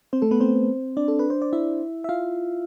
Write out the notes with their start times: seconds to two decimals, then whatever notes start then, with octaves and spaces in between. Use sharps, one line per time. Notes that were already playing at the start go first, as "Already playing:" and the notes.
0.13 C4 C5
0.22 A3 A4
0.31 B3 B4
0.40 C4 C5
0.97 D4 D5
1.08 A4
1.19 B4
1.30 C5
1.42 D5
1.53 E4 E5
2.04 E5
2.09 F4 F5